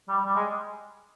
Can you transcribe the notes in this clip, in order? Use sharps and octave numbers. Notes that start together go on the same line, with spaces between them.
G3
G3
G#3